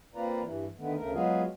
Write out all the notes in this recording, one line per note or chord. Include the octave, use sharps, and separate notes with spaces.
A#3 C4 F4 B4 D5 A#5
G2 E3
D3 D#3 A3 B3
D2 C#3 A3 A#4
F#3 G#3 B3 F4 F#4 G#4